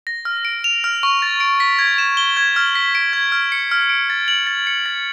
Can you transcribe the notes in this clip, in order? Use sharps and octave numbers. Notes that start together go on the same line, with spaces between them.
A#6
F6
D7
F7
F6
C#6
A6
D7
B6
G#6
E7
G7
G#6
F6
B6
D7
G#6
F6
C#7
F6
D7
A6
F#7
A6
C#7
A6